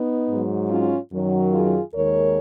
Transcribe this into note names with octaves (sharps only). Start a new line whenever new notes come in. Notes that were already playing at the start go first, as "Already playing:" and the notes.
Already playing: B3 D#4
G#2 F#3
C#4 F4
F#2 D#3 F#3
F4 G#4
D#2 D#3 G#3 A#4 C#5